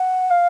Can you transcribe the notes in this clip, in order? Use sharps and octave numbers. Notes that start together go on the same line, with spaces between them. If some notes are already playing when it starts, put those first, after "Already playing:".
Already playing: F#5
F5